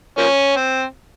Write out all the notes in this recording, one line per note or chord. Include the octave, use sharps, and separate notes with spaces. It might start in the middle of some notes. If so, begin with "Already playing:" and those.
F3 A#3 C#4
C4